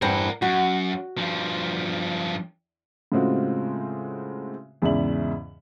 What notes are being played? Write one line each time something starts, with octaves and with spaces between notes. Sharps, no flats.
E2 G2 C4 A#4 F#5
F#2 F#4
G2 F3
A2 C#3 G#3 C4 F4 F#4
E2 G#2 C#3 D5 E5 F#7